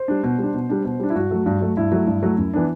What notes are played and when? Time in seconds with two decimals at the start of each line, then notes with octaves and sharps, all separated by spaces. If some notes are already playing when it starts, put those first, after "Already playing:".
Already playing: C5
0.08 G3 D4
0.23 B2
0.38 G3 D4
0.54 B2
0.69 G3 D4
0.84 B2
1.00 G3 D4
1.10 E4
1.15 G2 F#4
1.31 F#3 A3
1.46 G2
1.61 F#3 A3
1.77 G2 E4
1.92 F#3 A3
2.07 G2
2.22 F#3 A3
2.38 F#2
2.54 E3 B3 D4